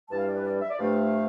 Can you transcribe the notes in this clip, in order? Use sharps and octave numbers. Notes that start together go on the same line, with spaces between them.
G2 E3 G3 A5
F5
D5
B4
D5
E5
D5
G2 F3 A3 F5